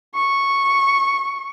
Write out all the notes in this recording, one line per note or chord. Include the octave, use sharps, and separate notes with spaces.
C#6